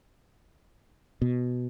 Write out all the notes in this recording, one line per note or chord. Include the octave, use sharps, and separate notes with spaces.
B2